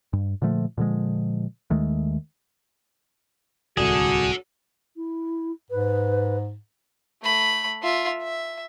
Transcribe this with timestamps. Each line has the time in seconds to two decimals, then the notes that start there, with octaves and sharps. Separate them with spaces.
0.13 G2
0.42 A#2 D3 F3 A3
0.78 A#2 D3 F3 G#3
1.70 D#2 D#3 G#3 A3
3.77 D1 C2 F#4 G#4 A4 D5
4.96 E4
5.71 G#2 B4
7.23 A3 B5
7.83 F4 E5
8.23 E5